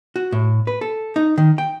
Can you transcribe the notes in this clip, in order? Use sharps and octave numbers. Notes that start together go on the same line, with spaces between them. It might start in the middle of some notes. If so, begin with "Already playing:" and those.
F#4
A2
B4
A4
D#4
D#3
G5